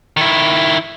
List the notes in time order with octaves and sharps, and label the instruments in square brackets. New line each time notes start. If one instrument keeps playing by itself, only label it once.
[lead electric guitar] D#3 E4